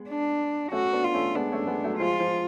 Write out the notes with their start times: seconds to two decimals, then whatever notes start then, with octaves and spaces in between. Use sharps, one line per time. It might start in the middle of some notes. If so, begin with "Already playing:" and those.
Already playing: G#3 B3
0.09 D4
0.72 A3 C#4 F#4
0.93 B3 D4
1.04 F4
1.14 A3 C#4
1.35 G#3 B3 D4
1.52 A3 C#4
1.67 G#3 B3
1.84 F#3 A3
1.99 F3 G#3 F4
2.20 F3